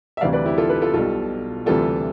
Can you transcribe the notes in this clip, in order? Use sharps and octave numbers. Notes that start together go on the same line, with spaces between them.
E5
D2 C3 E3 G3 D5 F5
B4 D5
E4 G4
F4 A4
G4 B4
F4 A4
B1 B2 G3 F4 A4
D2 C3 E3 G3 F4 A4